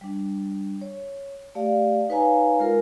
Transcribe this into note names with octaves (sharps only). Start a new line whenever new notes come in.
G3 D4
C#5
A3 G4 D5 F5
D#4 B4 C#5 F5 G#5 A#5
G#3 F4 A#4